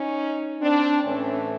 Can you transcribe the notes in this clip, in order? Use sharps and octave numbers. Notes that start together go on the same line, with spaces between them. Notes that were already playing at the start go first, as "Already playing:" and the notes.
Already playing: C#4 D#4
C4 D4
A2 E3 A3 C4 C#4